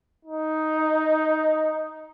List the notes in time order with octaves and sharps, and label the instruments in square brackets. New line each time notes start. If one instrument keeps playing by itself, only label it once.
[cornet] D#4